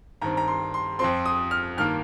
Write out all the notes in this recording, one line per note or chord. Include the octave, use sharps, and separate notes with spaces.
G2 D#3 C4 A#5
A#5
C6
C6
F2 F3 C4 C6
D#6
F6
G2 D#3 A#3 F6